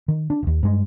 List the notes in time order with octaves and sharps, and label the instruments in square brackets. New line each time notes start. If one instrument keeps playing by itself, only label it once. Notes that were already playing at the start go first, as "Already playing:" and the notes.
[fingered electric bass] D#3
D4
E1 D#2
G2 G#3